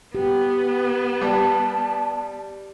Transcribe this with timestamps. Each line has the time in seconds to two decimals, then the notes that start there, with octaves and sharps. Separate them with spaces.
0.15 B3 G4
1.22 G3 A5